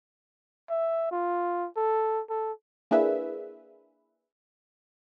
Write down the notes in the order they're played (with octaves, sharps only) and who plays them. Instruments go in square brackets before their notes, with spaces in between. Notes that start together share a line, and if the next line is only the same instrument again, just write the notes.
[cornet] E5
F4
A4
A4
[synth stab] A#3 D4 E4 G#4 B4 E5